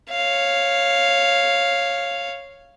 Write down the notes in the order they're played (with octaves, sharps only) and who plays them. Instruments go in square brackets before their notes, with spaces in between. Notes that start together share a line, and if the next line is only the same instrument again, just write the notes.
[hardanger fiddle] C#5 F5